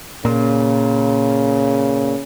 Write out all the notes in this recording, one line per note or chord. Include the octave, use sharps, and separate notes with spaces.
A#2 C#3